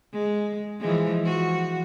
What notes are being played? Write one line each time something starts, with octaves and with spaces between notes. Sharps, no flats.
G#3
E3 F3 G#3
F3 F#4